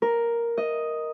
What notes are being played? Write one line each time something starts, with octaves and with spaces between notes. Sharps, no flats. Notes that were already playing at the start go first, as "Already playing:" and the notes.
A#4
D#5